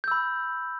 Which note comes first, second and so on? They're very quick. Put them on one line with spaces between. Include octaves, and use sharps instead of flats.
G6 E6 B5